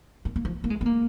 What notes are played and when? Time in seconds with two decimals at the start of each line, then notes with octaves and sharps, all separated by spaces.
0.25 A#3
0.36 A#3
0.45 F3
0.64 A#3
0.70 G#3
0.81 B3
0.86 A#3